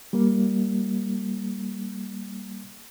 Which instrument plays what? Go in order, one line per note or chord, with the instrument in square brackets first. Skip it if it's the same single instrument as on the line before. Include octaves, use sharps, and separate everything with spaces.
[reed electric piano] G3 A#3